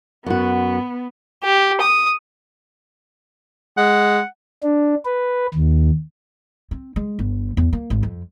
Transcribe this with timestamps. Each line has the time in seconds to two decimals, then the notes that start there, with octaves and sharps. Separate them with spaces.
0.26 F#2 B3 F#4
1.44 G4
1.80 D#6
3.77 G#3 F#5
4.63 D4
5.05 B4
5.54 D#2
6.71 C4
6.96 G#3
7.19 G1
7.57 E2
7.73 A#3
7.90 G#1
8.03 F2